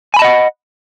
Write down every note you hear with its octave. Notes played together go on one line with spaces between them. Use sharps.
D#5 F#5 G#5 A5 B5